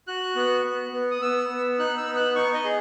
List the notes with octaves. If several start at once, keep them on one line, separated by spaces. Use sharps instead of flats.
F#4 F#6
B3
B3
B3
D#6
B3 E6
B3
D#4 F#6
E6
B3
F#6
D#4 C#6
D#5
G#4